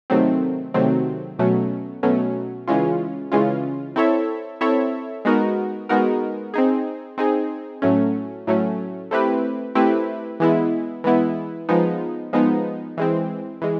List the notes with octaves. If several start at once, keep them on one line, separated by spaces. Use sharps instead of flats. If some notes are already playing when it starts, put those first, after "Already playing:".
C3 D#3 F#3 A3 C4
C3 D#3 F#3 A3 C4
B2 F#3 A3 C#4
B2 F#3 A3 C#4
C#3 E3 G#3 C#4 F4
C#3 E3 G#3 C#4 F4
C4 E4 A4 C#5 E5
C4 E4 A4 C#5 E5
G#3 B3 D#4 F#4 A#4
G#3 B3 D#4 F#4 A#4
C4 D#4 G#4
C4 D#4 G#4
A2 F#3 A3 C#4
A2 F#3 A3 C#4
A3 C4 E4 G4 B4
A3 C4 E4 G4 B4
E3 G#3 B3 E4
E3 G#3 B3 E4
F3 G#3 B3 D#4
F3 G#3 B3 D#4
E3 G#3 C4
E3 G#3